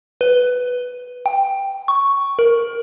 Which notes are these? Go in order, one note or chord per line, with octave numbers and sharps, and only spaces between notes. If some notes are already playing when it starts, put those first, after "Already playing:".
B4
G5
C#6
A#4